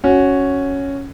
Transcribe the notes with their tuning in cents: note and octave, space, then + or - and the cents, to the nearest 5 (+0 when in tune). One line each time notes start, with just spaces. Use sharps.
C#4 +0 F#4 +0